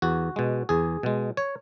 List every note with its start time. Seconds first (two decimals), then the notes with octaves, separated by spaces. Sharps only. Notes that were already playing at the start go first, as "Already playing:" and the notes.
0.02 E2 F#4
0.36 B2 G#3
0.69 E2 G#4
1.03 B2 G#3
1.37 C#5